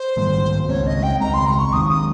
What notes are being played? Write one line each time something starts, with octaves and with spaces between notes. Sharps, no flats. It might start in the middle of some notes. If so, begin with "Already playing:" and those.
Already playing: C5
G#2 D#3 G3 A#3
C#2 C#3 G#3 C4 C#5
D#5
G5
C#2 C#3 G#3 C4 A#5
C6
A#5
C#6
D#2 D#3 G#3 C4 D#6
D#6